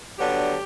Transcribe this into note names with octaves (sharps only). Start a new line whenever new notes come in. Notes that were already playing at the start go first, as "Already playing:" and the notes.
D3 F#3 B3 D4 G4